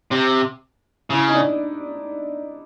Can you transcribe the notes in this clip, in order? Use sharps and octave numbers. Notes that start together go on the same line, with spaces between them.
C3
C#3 E4
D#4
D4